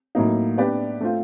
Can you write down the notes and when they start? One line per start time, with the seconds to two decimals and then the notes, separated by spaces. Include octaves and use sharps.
0.15 A2 F#3 A#3 D#4
0.57 B3 D4 G4 B4 D5
1.01 A3 C4 F4